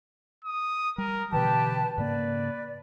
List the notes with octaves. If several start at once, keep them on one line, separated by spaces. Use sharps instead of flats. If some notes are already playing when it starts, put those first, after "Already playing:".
D#6
G3 A#4
B2 D3 E3 G4 B4 G5 A5
G#2 C#3 A#3 B4 D5